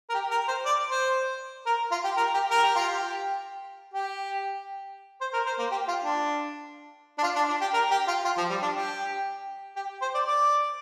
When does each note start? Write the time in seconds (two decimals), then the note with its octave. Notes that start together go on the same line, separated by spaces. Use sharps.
0.10 A#4
0.14 G4
0.31 A#4
0.48 C5
0.65 D5
0.90 C5
1.66 A#4
1.91 F4
2.04 G4
2.17 A#4
2.34 G4
2.51 A#4
2.63 G4
2.76 F4
2.89 G4
3.94 G4
5.21 C5
5.33 A#4
5.46 C5
5.59 A#3
5.71 G4
5.88 F4
6.04 D4
7.18 D4
7.23 F4
7.36 D4
7.48 D4
7.61 G4
7.74 A#4
7.91 G4
8.07 F4
8.25 F4
8.37 F3
8.50 G3
8.62 D4
8.75 G4
9.76 G4
10.01 C5
10.14 D5
10.27 D5